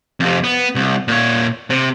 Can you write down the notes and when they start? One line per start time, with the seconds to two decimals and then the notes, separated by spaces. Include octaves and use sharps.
0.20 F2 C3
0.44 B3
0.75 C2
1.08 A#2 C#5
1.70 C3